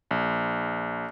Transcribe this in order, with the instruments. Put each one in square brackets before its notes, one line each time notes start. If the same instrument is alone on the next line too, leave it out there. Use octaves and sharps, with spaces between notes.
[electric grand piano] A#1